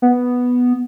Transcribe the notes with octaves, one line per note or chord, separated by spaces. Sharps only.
B3